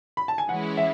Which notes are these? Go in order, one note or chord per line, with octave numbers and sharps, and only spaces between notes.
B5
A5
G#5
E3 G#3 C#4 E4 F#5
E5